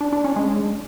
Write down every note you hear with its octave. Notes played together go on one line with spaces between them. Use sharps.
D4
D4
C#4
G#3